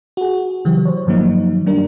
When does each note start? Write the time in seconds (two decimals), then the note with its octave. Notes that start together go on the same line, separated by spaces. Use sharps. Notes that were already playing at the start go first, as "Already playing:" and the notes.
0.17 F#4 G#4
0.65 C#3 E3 F#3 G4
0.85 C5 C#5
1.07 G2 D#3 F3 F#3 A#3 D#4
1.66 G3 D4 A#4